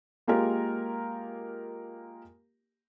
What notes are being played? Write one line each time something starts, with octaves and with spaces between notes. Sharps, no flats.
G#3 A#3 F4 G4 A#4